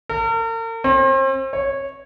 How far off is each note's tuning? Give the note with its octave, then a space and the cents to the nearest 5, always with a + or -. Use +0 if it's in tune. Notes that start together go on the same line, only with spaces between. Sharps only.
A#4 -45
C4 +40
C#5 -15